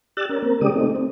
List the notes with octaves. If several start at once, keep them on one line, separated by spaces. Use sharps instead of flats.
G4 D5 E6 F#6 A6
C#4 A#4
A#3 C4 A#4
C#3 G#3 G4 D5 D#6
A3 C4 D#4
C4